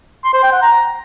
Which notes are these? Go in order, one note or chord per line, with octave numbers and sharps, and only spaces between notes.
C6
C5
G5
F#5
A#5